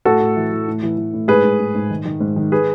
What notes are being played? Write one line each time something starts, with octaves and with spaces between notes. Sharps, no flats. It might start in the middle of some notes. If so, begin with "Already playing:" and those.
A2 F#4 A4
A2
E3
E3
A2
E3
E3
A2
G#2 G#4 B4
G#2
G#2
G#2
D#3
D#3
G#2
D#3
G#4 B4